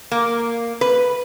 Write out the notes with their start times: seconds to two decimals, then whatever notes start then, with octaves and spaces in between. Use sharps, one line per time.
0.12 A#3
0.81 B4